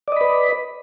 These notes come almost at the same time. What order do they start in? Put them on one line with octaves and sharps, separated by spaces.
D5 D#5 B5 B4